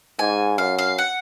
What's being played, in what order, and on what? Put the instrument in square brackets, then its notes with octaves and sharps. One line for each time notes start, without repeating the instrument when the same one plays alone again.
[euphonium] G#2 [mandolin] G#5
[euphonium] F#2 [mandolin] F5
[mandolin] F5
F#5